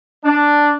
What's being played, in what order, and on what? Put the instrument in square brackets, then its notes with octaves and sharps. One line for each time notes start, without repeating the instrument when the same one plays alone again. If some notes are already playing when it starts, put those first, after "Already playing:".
[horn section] D4